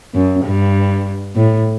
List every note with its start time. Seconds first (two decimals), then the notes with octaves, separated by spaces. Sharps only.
0.14 F#2
0.45 G2
1.36 A2